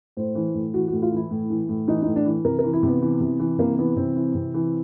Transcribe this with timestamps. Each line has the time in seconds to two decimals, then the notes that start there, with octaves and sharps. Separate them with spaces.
0.17 A2 C5
0.35 E3
0.54 A2
0.74 E3 F#4
0.88 A2 F#4
1.02 F4
1.12 E3 E4
1.31 A2
1.50 E3
1.69 A2
1.88 E3 D#4
2.02 A2 D#4
2.16 D4
2.26 E3
2.45 C3 A#4
2.59 A#4
2.64 E3
2.73 E4
2.83 C3 B3
3.02 E3
3.21 C3
3.40 E3
3.58 C3 A#3
3.78 E3 B3
3.97 C3 C4
4.16 E3
4.35 C3
4.54 E3